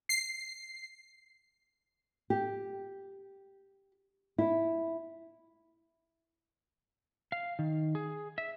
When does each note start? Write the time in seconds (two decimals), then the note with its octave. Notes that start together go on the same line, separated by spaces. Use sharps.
0.09 C7
2.30 G4
4.38 E4
7.32 F5
7.59 D#3
7.95 G#4
8.38 E5